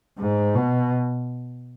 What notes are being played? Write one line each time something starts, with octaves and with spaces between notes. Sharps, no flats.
G#2
B2